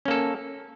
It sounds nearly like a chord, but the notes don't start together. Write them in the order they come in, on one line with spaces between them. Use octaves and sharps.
C#4 A#3 A4